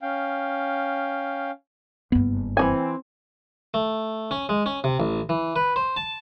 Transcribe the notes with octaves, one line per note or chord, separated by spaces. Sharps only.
C#4 F5 G5
F#1 G2 B3
E3 C4 F#4 G#5
A3
C#4
G#3
C#4
C3
A1
E3
B4
C5
A5